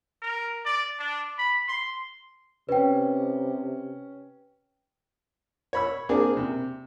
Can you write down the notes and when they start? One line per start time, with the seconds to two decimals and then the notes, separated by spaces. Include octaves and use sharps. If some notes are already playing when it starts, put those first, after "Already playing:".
0.22 A#4
0.65 D5
0.99 D4
1.38 B5
1.68 C6
2.69 C3 C#4 B4 G5
5.73 C#5 B5 E6
6.09 A#3 C4 D4 G#4 D6
6.37 C3